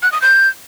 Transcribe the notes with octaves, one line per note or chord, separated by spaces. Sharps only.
F#6
D#6
G6